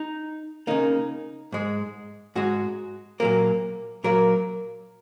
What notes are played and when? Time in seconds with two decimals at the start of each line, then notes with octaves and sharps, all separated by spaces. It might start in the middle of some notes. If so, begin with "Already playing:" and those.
Already playing: D#4
0.67 C#3 A#3 D#4
1.52 G#2 G#3
2.35 G#2 G#3 F#4
3.20 A#2 F#3 A#3 A#4
4.04 A#2 F#3 A#3 A#4